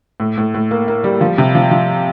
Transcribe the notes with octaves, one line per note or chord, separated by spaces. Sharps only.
A2
A2
A2
A#3
A#3
G3
F3
C3
F3
F3